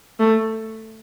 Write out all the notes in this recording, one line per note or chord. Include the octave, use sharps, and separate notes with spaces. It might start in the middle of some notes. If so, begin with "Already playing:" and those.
A3